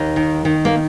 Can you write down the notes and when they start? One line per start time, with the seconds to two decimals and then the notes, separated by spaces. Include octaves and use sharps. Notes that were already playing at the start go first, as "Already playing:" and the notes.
Already playing: D#2 D#4
0.16 D#3
0.45 D#3
0.65 A#3